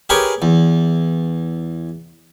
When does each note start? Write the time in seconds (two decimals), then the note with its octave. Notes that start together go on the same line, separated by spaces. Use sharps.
0.10 G4 G#4 A#4 B4 C#5
0.42 E2